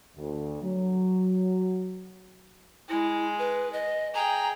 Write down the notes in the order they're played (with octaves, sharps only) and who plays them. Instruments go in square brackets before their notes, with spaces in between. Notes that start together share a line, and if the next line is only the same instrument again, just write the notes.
[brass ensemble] D2
F#3
[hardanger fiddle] G#3 [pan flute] E4
[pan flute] B4
D#5
[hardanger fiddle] G#4 G5 [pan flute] A#5